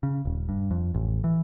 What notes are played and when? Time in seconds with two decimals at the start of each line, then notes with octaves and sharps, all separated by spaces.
0.03 C#3
0.25 D#1
0.49 G2
0.71 F2
0.94 A1
1.24 E3